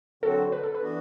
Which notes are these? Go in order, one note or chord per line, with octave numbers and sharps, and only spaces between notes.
D3 F#3 C4 F#4 A4
B4
A4
B4
E3 B3 D4 F#4